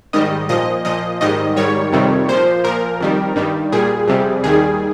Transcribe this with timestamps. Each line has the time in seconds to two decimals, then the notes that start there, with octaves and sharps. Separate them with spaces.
0.13 G#2 D#3 G3 D#5
0.49 A#2 F3 D#5
0.85 A#2 F3 D#5
1.21 G#2 D#3 G3 D#5
1.56 G#2 D#3 G3 C#5
1.93 F2 C3 D#3 G3
2.28 A#2 F3 C5
2.64 A#2 F3 A#4
3.01 F2 D#3 G3
3.36 G2 D#3 G3
3.72 A#2 G3 G#4
4.08 F2 C3 G3
4.43 D#2 D#3 G3 G#4